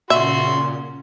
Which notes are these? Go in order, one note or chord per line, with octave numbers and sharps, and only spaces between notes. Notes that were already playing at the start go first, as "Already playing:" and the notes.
A#2 C#3 C#4 F#4 E5 C6